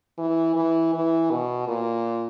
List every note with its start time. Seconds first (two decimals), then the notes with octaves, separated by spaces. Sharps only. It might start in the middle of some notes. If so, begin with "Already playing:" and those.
0.18 E3
0.56 E3
0.94 E3
1.31 B2
1.68 A#2